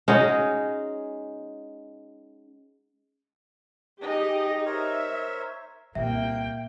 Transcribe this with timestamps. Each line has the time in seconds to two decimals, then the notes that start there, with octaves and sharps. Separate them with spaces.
0.08 G#3 C#4 D#4 F#4
4.01 D#4 G4 G#4 D#5
4.66 A#4 C5 C#5 E5
5.95 C2 A#2 A#3 E5 G5